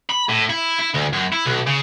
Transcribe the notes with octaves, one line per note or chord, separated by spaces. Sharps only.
B5
A2
E4
E4
D2
F#2
E4
B1
C#3